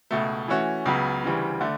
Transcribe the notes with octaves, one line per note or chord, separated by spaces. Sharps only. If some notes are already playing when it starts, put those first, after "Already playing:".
C#2 B2 A3
E3 A3 C#4 F#4
C#2 C#3 F#3 B3
D2 C#3 E3 G3
D3 A3